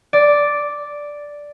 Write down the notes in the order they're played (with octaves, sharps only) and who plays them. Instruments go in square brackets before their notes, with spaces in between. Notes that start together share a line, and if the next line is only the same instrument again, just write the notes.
[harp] D5